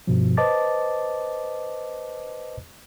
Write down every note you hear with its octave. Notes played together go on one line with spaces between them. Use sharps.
G2 B2 F3
B4 C5 D#5 A5 D6 A6